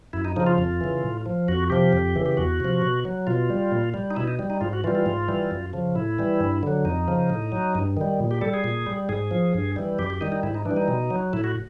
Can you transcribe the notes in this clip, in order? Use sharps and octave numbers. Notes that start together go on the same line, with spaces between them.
F#2 E4
D#4
C#3 F3 D#4
F4
F2
C#3 E3
A2
F3
F2 F#4
C3 F3 G4
F2
C#3 E3
G4
E2 F#4
C3 F3
B2
F#3
B2 F4
G3
A#2
G3
D#4
B2 E4
D#4
G3
D#4
G#2 F4
F#4
E3 G3 F4
F4
G#2
E3 G3
F#2
C#3 F3
A2 E4
E3 G3
G2
D3 F#3
F2 D#4
C#3 F3
A2
F#3
G2
D#3 G3
A#2
G4
G3 A4
G#4
A#2
G3
G#2 G#4
F3
G2
E3 G3
F#2 G4
G4
D#3 G3 D#4
D#4
G#2 E4
D#4
E3 D4
G3
D#4
B2
F#3
A2 E4
F#4